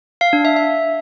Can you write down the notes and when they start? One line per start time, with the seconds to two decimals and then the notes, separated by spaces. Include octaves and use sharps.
0.21 F5
0.33 D4
0.45 E5
0.56 E5